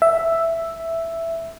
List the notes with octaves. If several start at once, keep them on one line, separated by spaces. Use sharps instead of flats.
E5